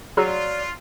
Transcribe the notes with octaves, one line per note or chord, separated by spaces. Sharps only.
F#3 F4 G#4 D5 A#5 E6